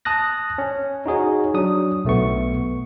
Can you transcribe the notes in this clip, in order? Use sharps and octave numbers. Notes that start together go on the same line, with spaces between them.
A5 D#6 F#6 A#6
C#4
D#4 F#4 G#4 C#5
F#3 D4 D#6
B1 A3 B3 C#6